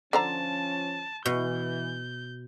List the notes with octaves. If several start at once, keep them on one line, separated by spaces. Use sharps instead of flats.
D3 F3 C#4 C5 A5 A#5
B2 E3 G6